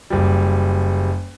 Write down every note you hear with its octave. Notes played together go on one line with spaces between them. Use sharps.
F#1 G3